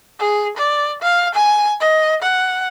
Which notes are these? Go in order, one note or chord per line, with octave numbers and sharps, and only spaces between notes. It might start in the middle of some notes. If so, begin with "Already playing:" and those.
G#4
D5
F5
G#5
D#5
F#5